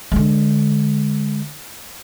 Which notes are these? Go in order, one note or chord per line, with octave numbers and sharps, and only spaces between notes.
D3 G#3